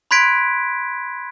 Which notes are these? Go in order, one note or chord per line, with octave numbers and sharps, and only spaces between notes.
B5 C6 F#6 G#6 B6 D7